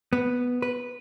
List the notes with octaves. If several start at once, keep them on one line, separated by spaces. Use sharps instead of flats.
B3
B4